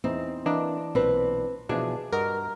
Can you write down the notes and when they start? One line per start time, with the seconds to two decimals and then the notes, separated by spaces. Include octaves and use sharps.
0.04 E2 E3 C4 D#4
0.46 E3 A#3 D4 D#5 A#5
0.95 B1 A#2 C4 B4
1.69 B2 E3 F3 D4 G#4
2.12 G2 F#4 A#4 D#5